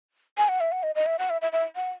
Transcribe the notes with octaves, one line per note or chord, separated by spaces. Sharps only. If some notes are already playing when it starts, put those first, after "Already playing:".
G#5
F#5
E5
F#5
D#5
D#5
E5
F#5
E5
E5
E5
F#5